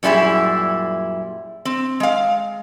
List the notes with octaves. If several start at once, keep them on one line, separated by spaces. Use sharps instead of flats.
F#2 A#2 G3 E4 G#4 E5
C4
G#3 F5